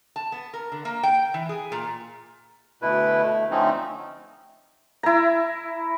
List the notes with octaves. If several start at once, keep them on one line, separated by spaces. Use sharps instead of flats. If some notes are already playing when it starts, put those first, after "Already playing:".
A5
B3
A#4
D3
A#3
G5
E3
G#4
A#2
D2 B2 E4 B4
A3
D3 F3 A3 C4 C#4 D#4
E4 A#5